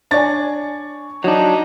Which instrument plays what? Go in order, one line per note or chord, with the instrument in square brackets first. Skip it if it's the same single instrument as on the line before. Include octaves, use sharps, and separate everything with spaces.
[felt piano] D4 D5 G#5 [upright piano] C#5 C#6 A6
[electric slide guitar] F#3 D4 [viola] D#4